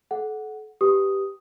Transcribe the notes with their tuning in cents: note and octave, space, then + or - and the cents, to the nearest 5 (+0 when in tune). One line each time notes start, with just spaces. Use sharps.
A4 -35 F#5 +0
G4 +0 B4 +0 D#6 +0